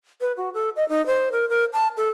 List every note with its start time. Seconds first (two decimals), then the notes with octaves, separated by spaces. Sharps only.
0.21 B4
0.37 F#4
0.54 A4
0.76 D#5
0.89 D#4
1.07 C5
1.32 A#4
1.49 A#4
1.73 A5
1.97 A4